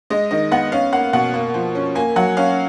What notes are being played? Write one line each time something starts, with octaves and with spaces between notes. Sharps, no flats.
G#3 D#5
D#3 D#5
B3 F#5
C#4 F5
A#3 F#5
B2 F#5
A#3
F3
C#4
A#3 G#5
F#3 F#5
C#4 F5